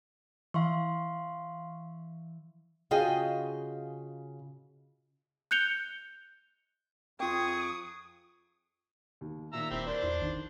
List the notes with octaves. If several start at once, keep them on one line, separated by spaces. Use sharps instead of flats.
E3 F5 C6 C#6
C#3 F4 F#4 G#4 D#5 G5
F#6 G6 C#7 F7 G7
F2 F4 G#4 G5 C#6 D#6
D#2
A#2 D#3 E5 A#5 E6
D#1 C4 E4 G4
D4 A#4 C5 D5
E2 E4
G#1 D3 D#3